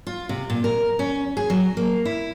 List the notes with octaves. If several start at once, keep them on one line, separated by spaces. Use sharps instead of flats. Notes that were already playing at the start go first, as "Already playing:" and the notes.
F4
C3
A#2
A#4
C#4
G#4
F#3
A#3
E4